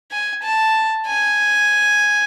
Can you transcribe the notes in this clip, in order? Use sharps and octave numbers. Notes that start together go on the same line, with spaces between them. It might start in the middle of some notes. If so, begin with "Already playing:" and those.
G#5
A5
G#5